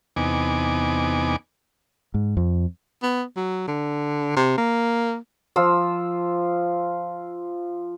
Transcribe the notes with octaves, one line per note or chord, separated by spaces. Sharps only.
E2 C3 B3 D#4 G#5 D6
G#2
F2
B3
F#3
D3
C3
A#3
F3 F4 E6